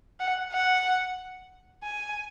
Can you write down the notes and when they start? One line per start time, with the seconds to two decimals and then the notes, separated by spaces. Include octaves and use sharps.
0.20 F#5
0.53 F#5
1.83 G#5